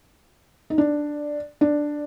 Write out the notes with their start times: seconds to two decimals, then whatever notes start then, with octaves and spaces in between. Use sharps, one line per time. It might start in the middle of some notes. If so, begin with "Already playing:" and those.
0.70 D#4
0.78 D4
1.61 D4